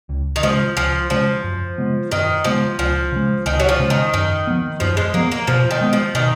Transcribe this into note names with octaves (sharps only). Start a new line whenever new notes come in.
C#2
D#3
C#3 F3 G#3
C#2 F3
C#3 F3 G#3
F#2
C#3 G#3 B3
F#2 D#3
C#3 F3 G#3 B3
C#2 F3
C#3 G#3
C#2 D#3
F#3
F3
C#3 G#3
D#3
F#2 D#3
F3 B3
F#2 F3
G#3
F3 A#3 B3
A#3
B2 F3
D#3
G#3 B3
F3
B2 D#3